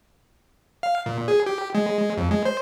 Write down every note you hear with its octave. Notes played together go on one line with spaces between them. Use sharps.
F5
A#2
G#4
G4
G#3
F2
G#3
C5